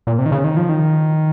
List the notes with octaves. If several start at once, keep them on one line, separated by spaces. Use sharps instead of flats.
A#2
C3
D#3
C#3
D#3
F3
D#3